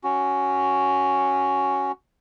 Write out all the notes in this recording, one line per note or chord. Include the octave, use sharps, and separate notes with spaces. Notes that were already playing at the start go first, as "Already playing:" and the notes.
C#4 F#4